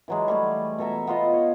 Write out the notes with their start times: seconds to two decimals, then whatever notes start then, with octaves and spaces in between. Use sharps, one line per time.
0.08 E3 F#3 G#3
0.28 G3 A3 G#4
0.78 B2 A4 E5 A#5
1.07 B3 F4 D#5
1.33 C#5